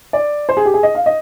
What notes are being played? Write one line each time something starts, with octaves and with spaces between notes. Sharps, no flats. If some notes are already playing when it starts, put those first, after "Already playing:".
D5
C5
G#4
G4
G#4
D#5
F5
D#5